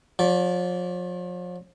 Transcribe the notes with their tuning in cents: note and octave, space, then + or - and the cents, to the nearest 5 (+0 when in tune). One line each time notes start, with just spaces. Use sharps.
F3 +40 D5 -20